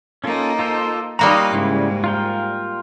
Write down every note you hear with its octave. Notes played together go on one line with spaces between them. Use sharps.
A#3 C#4 D#4 F4 A4
F4 A4 C5
G3 A#3 D#4 F4 F#4 A#5 B5 D#6
G#2 C#3 E4
F4 A#4 G5